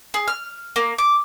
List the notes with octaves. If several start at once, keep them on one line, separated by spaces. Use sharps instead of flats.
G#4
F6
A#3
D6